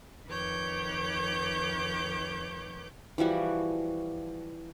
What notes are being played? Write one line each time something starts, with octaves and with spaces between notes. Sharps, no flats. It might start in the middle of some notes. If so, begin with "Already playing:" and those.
F2 D#3 B4 C#5 D6 G6
E3 F3 G3 F#4